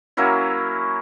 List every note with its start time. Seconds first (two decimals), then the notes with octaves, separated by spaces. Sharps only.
0.17 F#3 A#3 C#4 E4